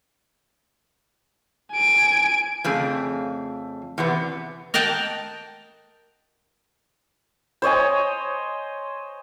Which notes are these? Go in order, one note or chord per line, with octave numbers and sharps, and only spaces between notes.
G#5 D7
F2 C#3 A3 G#4
E2 C3 B3
A#4 D#5 F#5 G5 A5
C5 C#5 D#5 G#5